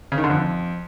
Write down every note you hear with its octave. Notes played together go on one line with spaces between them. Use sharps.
C#3
D#3
D3
F2